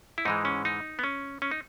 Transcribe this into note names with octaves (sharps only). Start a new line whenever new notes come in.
E4
G#2 E3 G#3 D#4
C#4
D#4
B3
C#4
C#4
D#4